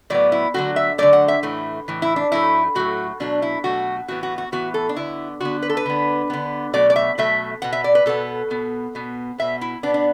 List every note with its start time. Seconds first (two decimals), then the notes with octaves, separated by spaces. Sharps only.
0.10 A2 F#3 B3 D5
0.32 E4
0.54 D3 F#3 A3 F#4
0.76 E5
0.98 D3 F#3 A3 D5
1.13 F#5
1.28 E5
1.43 A2 E3 A3
1.88 A2 E3
2.02 E4
2.16 D4
2.32 A2 F#3 A3 E4
2.75 A2 F#3 A3 F#4
3.20 B2 F#3 A3 D4
3.42 E4
3.64 B2 F#3 A3 F#4
4.08 A2 E3 B3 F#4
4.23 F#4
4.38 F#4
4.52 A2 E3 B3 F#4
4.74 A4
4.89 D4
4.96 D3 B3 E4
5.40 D3 B3 F#4
5.62 B4
5.69 A4
5.77 B4
5.86 D3 B3
6.30 D3 B3
6.73 B2 F#3 A3 D5
6.90 D5
6.96 E5
7.18 B2 F#3 A3 E5
7.62 B2 B3 F#5
7.73 E5
7.84 D5
7.95 B4
8.06 B2 B3 A4
8.50 B2 B3
8.95 B2 B3
9.38 B2 B3 E5
9.61 E4
9.83 B2 B3 D4
9.94 D4